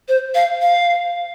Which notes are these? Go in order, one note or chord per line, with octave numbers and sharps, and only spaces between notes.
C5
F5
F5